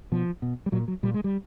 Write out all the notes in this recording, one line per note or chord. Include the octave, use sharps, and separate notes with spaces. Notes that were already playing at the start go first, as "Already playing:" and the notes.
B2 F3
B2
G3
A#2 F#3
F#3
A#2 G3
G#3
G3